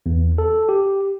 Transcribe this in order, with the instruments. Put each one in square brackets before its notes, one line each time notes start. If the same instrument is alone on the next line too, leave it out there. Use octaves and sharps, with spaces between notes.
[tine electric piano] E2
A4
G4